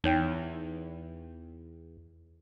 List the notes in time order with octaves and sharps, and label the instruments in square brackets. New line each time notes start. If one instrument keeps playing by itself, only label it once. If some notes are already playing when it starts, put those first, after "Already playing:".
[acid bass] E2 [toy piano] D#4 C#5 G5